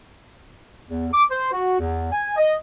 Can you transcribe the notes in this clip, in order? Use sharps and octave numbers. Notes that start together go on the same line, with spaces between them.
E2
D6
C5
F#4
E2
G#5
D#5